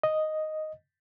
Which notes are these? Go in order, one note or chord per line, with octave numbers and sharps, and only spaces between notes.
D#5